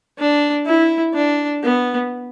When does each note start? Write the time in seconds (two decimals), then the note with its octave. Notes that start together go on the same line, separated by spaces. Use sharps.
0.19 D4
0.66 E4
1.14 D4
1.63 B3